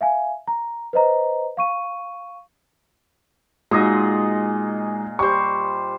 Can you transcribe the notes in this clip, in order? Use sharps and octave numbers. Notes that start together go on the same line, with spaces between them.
E5 F5 G#5
A#5
B4 C5 D#5 A#5
F5 C#6 D#7
A#2 G#3 D#4 F#4 G#4 D#5
G3 C5 C#6